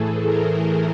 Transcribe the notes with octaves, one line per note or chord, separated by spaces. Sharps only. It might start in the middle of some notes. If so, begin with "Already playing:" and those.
Already playing: A2 E3 A3 G#4 A4
A#4